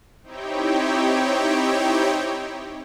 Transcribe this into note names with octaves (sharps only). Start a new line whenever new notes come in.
C4 D#4 E4 G4 C#5 G5